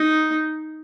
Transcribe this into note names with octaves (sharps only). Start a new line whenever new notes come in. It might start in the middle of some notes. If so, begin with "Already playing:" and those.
Already playing: D#4